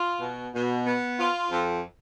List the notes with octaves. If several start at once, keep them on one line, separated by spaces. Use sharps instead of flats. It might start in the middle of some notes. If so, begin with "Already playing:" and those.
Already playing: F4
B2
B2
B3
F4
F2